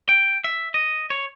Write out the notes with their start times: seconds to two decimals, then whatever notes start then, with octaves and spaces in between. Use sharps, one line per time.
0.09 G5
0.44 E5
0.74 D#5
1.10 C#5